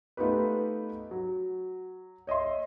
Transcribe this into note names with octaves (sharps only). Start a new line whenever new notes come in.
A3 B3 D#4 F4 G4 B4
F#3
C#5 D#5 E5 C6